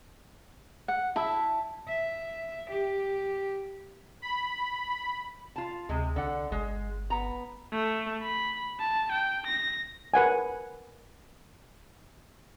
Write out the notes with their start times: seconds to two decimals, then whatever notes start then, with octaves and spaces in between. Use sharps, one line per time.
0.88 F#5
1.16 E4 E5 A5
1.88 E5
2.69 G4
4.22 B5
5.56 F4 A5
5.89 D2 C3 G#3 G#4
6.16 C2 D3 F#5
6.52 G1 G#3
7.10 B3 A#5
7.72 A3
8.22 B5
8.79 A5
9.12 G5
9.47 A#6
10.14 A#4 B4 F#5 G#5